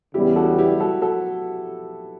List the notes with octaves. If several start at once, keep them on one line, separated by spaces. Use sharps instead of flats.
E2 C#3 G3 B3 E4 G4
F#4 A4
E4 G4
F#4 A4
F#4 A4